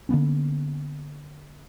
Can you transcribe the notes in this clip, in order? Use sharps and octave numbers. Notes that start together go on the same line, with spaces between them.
D3 A#3 B3 C#4